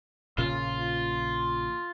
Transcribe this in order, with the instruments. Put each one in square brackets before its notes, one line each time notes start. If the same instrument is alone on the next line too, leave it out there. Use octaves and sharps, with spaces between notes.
[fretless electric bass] A#1 A#2 C#3 [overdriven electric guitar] F4